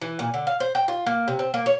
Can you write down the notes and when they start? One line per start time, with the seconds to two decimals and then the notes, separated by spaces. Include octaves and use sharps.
0.02 E3
0.19 A#2
0.34 D3
0.47 F5
0.60 C5
0.75 G5
0.88 F4
1.06 A#3
1.28 C3
1.39 C4
1.54 A#3
1.66 C#5